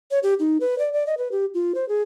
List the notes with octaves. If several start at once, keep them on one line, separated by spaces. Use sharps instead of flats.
C#5
G4
D#4
B4
D5
D5
D#5
B4
G4
F4
C5
G#4